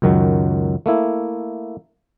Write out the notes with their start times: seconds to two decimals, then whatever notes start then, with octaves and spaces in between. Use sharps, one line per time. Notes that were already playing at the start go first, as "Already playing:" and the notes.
0.02 C#2 F#2 D#3 F#3
0.86 A3 A#3 E4